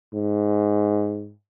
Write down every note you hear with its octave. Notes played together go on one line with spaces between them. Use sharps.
G#2